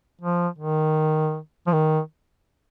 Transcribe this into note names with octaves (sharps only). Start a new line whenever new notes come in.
F3
D#3
F3
D#3